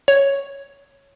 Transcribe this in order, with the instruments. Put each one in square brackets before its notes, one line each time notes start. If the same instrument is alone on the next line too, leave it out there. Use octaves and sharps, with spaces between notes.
[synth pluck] C#5